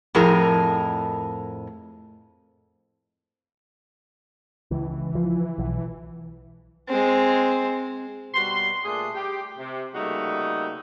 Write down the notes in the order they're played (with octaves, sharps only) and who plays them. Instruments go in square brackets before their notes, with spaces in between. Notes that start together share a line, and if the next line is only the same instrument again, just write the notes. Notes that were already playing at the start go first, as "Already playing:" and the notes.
[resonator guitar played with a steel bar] F2 A2 G#4 A#4
[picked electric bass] C#2 [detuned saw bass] E3
[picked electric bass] F3
B1
[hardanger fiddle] G#3 C4
[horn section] B2 G3 F#4 C6
A#2 A3 D4 G#4 C6
G4
C3
C#3 G3 A3 A#3 D#4 F#4